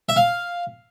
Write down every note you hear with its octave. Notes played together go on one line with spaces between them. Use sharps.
E5
F5